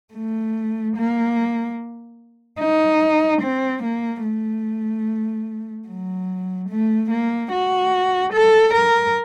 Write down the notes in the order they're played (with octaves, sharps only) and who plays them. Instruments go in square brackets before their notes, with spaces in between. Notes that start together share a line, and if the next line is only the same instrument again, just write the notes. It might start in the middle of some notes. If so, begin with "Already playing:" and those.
[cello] A3
A#3
D#4
C4
A#3
A3
F#3
A3
A#3
F#4
A4
A#4